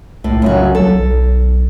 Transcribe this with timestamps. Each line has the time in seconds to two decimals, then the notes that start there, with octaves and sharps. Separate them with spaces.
0.24 C2 A2
0.42 F#2 C#3 F#4
0.75 F#3 A4
0.94 B1